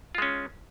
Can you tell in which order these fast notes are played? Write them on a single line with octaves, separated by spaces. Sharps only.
F4 G#3 C#4